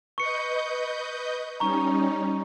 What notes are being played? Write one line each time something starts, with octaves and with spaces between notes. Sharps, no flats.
B4 D#5 C#6 G6 C#7
G3 C#4 D#4 A#5 C#6